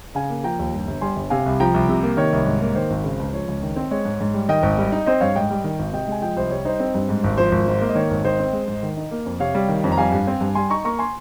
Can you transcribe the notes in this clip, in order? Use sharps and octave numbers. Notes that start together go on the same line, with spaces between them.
C#3 F5 G#5
A#3
F3 G5 A#5
D#2
G2
G1
G3 G#5 C6
G1
C3 F5 G#5
C2
F3 G5 A#5
C2
C3
A#3
D#3 C#5
C2
G#2
A#3
D#3 C5
G#1
C#3
C#2
F3 C#5
C#2
D#3
C4
G#3 C#5
G#2
G#2
G3
D#3 D#5 G5
G#1
G3
D#4
C4 C5 D#5
G2 C#5 F5
G#2 D#5 G5
G3
D#3
G#1
C3 D#5 G5
G#3 G#5
F3 D#5 G5
C2 C5 D#5
G3 C#5
D#4 C5
C4
G2
G#2
G#1
F3 C5
G#1
G#2
A#3
D#5
D#3 C#5
G#1
D#3 C5 D#5
C4
G#3
G#2
D#3
D#4
A#3
F2
C3 C#5 F5
G3
D#3
F2
A#5
G3 F5 G#5
G2
C4
G2
G3 G#5 C6
D#4 A#5 C#6
A#3 A#5 C#6
G#5 C6